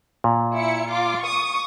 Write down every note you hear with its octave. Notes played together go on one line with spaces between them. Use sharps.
A#2
E4 C#7
F4 D6
C#6 D#6